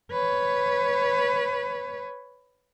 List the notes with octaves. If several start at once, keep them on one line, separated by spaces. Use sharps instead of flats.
B4 C#5